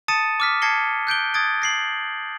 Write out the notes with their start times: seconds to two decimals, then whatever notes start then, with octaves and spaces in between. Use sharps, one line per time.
0.08 A5 D#6 A6 C#7 D#7 E7
0.40 D6 F6 B6
0.62 A5 G#6 A#6 C7 C#7 G7
1.07 F#6 G6 D7 G7
1.34 D#6 G#6 A6 D7
1.62 A#6 C7 F#7